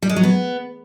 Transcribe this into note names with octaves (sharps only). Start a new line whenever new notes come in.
G3
G#3
F#3
B3